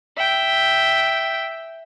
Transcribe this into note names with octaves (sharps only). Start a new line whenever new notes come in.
E5 G5